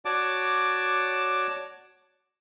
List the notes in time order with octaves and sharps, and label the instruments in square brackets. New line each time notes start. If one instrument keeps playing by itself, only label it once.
[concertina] F#4 C#5 D5 A5 D6